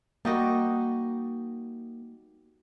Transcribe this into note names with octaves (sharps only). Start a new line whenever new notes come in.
G3 A#3 D#4 F#4